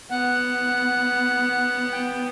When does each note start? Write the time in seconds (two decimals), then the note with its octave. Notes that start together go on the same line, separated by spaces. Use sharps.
0.11 B3 F#5
1.93 G5